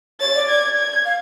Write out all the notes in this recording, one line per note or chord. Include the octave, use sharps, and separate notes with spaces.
C#5 A6
D5
G#6
G#6
F5